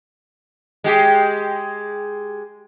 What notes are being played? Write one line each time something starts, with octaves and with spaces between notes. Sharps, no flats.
G#3 G4